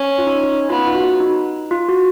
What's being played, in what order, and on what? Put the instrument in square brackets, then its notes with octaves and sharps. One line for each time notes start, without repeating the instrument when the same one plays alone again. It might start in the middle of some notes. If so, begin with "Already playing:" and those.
Already playing: [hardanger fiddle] C#4
[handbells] F4
D#4
D#4
[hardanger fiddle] B3 [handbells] F4
[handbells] D#4
F4
F#4
D#4
F4
F#4